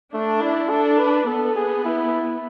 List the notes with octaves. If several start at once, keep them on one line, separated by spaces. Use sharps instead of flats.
A3 D4
E4
D4 A4
B4
B3 A4
G#4
E4